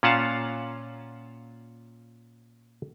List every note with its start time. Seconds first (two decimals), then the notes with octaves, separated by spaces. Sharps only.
0.03 A#2 C#4 F4 F5 F#5 A5